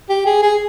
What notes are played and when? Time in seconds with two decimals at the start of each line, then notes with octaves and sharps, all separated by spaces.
0.09 G4
0.26 G#4
0.43 G#4